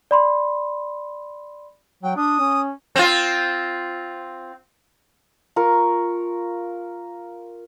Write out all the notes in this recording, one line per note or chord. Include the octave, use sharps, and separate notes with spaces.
D5 B5 C6
F#3 G5
D4 D#6
C#4
C4 F4
F4 A#4 C#6